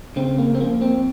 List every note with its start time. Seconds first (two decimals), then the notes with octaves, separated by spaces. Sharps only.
0.16 C#3 C4
0.38 A#3
0.55 C4
0.60 F3 A#3
0.81 C4